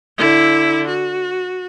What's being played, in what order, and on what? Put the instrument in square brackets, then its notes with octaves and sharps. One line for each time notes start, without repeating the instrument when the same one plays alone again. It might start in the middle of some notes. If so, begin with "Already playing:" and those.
[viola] D3 E4
F#4